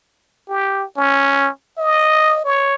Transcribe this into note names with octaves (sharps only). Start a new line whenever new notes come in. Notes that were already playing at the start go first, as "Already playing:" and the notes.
G4
C#4
D#5
C#5